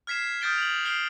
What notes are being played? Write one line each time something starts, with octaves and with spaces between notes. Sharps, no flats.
F6 G#6 B6 C7 E7
D#6 F6 G6 A6 D7 G7
F7 F#7
F6 G6 C7 D7 F7 G7